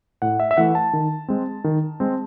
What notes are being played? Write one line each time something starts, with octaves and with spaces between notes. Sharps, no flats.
A2 F#5
E5
E5
E3 A3 F#5
A5
D#3
G#3 C4
D#3
G#3 C4